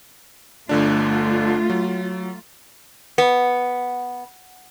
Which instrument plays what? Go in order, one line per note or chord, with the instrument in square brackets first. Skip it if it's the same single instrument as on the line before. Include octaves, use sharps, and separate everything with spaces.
[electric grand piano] G1 D3 D4 [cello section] A3 F4
[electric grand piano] F#3
[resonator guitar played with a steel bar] B3